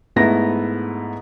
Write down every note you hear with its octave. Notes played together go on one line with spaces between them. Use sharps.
G#2 A3 B3 E4 A#6